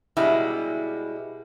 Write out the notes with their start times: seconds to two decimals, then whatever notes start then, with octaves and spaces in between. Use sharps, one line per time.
0.17 B2 G3 G#3 E4